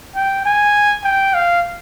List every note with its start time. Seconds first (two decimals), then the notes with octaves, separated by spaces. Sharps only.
0.15 G5
0.46 G#5
1.04 G5
1.34 F5